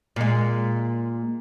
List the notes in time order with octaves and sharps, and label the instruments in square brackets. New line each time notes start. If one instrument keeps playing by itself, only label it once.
[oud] A#2 G#3